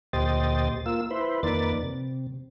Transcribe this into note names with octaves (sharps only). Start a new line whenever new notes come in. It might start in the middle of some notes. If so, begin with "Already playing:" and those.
D2 A#2 G4 C5 D#5 A6
A#3 F4 E6
E4 B4 C5
F2 D#3 A#3 B4 D5 A6
C3